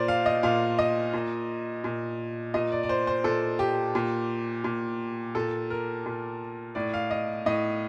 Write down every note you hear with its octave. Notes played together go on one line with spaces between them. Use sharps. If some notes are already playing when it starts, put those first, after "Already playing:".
Already playing: A#2 C5 D5
F5
D#5
A#2 F5
D#5
A#2
A#2
A#2 D#5
D5
D5
C5
C5
A#2 A4
G4
A#2
A#2
A#2 A4
A#4
A#2
A2 D5
F5
D#5
A2 D#5